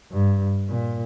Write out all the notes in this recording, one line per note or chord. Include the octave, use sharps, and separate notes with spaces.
G2
A#2